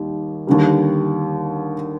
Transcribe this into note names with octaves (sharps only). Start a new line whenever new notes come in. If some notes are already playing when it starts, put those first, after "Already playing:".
Already playing: D#2 D#3 G3
D#2 D3 G3